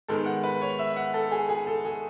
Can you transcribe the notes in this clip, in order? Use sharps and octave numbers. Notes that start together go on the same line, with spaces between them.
G#2 D#3 G#3 B3 A4
F#5
B4
C#5
E5
F#5
A4
G#4
G#4
A4
G#4